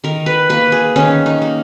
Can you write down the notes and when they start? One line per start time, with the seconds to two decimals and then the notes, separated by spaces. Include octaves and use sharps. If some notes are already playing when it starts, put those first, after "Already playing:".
0.04 D#3 A#4
0.26 B4
0.49 A#3 B4
0.72 G#4
0.96 D#3 C#4
1.26 D#4
1.42 A#3